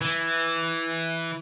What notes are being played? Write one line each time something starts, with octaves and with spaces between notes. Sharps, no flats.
E3